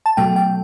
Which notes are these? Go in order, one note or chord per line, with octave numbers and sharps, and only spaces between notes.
A5
B2 F#3 A3 G5
G5